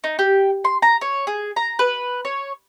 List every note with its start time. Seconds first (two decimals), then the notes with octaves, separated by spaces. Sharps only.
0.04 D#4
0.19 G4
0.64 C6
0.82 A#5
1.01 C#5
1.27 G#4
1.56 A#5
1.79 B4
2.25 C#5